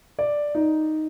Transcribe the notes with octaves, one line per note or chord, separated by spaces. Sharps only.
D5
D#4